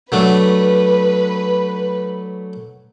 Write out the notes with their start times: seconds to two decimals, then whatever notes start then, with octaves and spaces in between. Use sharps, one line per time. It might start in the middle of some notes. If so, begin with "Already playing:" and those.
0.12 F#3 A3 D4 B4